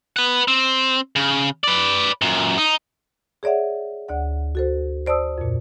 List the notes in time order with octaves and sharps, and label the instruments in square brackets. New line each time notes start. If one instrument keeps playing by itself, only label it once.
[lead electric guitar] B4 F#5
C4
C#3
B4 D5
F#2 A#2
D#4
[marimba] G#4 C#5 D5 E5 F#5
D2 D5 F#5
F#4 A4 C5
C5 D5 A5 D#6 E6
F2 A#2